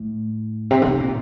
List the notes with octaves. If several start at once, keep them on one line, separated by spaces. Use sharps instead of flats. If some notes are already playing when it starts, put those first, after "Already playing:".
Already playing: A2
C3
D3
C3
A#2